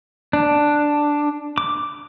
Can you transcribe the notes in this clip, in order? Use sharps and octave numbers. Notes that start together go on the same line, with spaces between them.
D4
D6